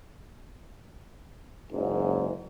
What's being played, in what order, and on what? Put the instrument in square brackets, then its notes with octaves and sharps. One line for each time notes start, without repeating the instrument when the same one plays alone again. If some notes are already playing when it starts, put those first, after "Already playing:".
[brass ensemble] F#1 G#2